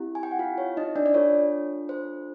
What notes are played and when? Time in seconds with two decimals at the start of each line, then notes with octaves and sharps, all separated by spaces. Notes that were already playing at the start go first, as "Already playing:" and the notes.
Already playing: C4 E4 G4
0.15 G#5
0.23 G5
0.31 F#5
0.39 F4 F5
0.58 C#5
0.77 D#4 D#5
0.95 D4 D5
1.06 D5
1.14 D4 F4 A4 C#5
1.89 C5